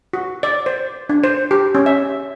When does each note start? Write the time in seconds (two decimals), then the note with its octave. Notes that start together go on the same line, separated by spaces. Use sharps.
0.13 F#4
0.43 D5
0.66 C5
1.09 D4
1.24 C5
1.51 G4
1.75 C#4
1.86 E5